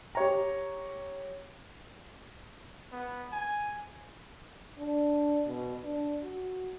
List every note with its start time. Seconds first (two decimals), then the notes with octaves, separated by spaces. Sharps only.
0.15 G4 C#5 A#5
2.92 B3
3.32 G#5
4.79 D4
5.46 B2
5.84 D4
6.23 F#4